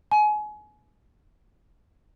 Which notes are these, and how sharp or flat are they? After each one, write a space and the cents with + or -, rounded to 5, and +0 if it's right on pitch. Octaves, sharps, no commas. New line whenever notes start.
G#5 +30